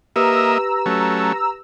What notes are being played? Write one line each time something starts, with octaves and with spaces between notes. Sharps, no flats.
A#3 G4 B4 D#5 E5 A#5 E6
F#3 A3 C#4